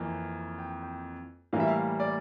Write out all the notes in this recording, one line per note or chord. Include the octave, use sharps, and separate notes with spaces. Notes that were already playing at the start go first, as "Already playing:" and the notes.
Already playing: F2 E3 A#3
G5
G5
A2 E3 G3 A#3 F5
E5
F5
D5